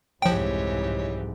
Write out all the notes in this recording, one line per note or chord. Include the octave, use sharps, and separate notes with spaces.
C2 F2 G#2 E3 F3 G4 C#5 G5